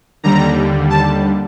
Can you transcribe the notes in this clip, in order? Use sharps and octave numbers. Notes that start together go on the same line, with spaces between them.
D#2 D3 G3 A#5
A5